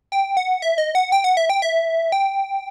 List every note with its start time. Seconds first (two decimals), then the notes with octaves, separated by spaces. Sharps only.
0.12 G5
0.37 F#5
0.62 E5
0.78 D#5
0.95 F#5
1.12 G5
1.24 F#5
1.37 E5
1.50 G5
1.62 E5
2.12 G5